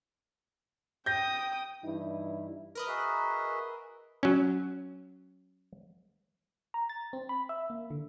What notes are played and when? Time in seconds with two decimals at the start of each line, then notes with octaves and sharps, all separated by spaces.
1.06 G5 D#6 G6 A#6
1.84 G2 E3 D#4 E4
2.75 A#4 B4 D#5
2.88 F#4 G#4 E5
4.23 F#3 C#4
6.74 A#5
6.89 A6
7.13 C4
7.29 B5
7.49 E5
7.70 A#3
7.90 D3